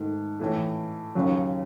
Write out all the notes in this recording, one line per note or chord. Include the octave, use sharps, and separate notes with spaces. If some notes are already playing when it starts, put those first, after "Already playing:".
Already playing: G#2 D#3 A3
A2 E3 A3
D#2 C#3 F#3